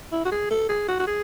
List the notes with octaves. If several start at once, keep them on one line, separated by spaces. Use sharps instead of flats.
E4
F#4
G#4
A4
G#4
F#4
F#4
G#4